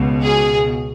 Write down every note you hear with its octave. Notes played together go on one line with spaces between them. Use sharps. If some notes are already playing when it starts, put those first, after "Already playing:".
Already playing: C#2 B2
G#4